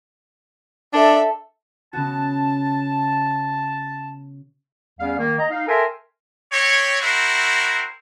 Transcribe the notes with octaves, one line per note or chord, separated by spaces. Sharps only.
D4 A4 E5
C#3 B3 F#4 A5
E2 G3 B3 C#4 F5
D#3 A#3
D#5 A#5
D#4 F5
A4 A#4 E5 G5 G#5 C6
C4 G4 C#5
C4 E4 F#4 A#4 C5